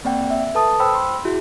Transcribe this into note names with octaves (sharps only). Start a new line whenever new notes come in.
A#3 C4 D5 F#5 G5
E5
A4 B4 A5 D#6
C5 G5 B5 E6
C6
E4 F#4 G#4